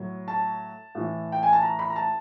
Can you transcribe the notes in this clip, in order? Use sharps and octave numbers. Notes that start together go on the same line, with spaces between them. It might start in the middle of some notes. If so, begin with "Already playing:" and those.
Already playing: A2 F#3
A5
A2 E3
G5
G#5
A5
A#5
B5
A#5
A5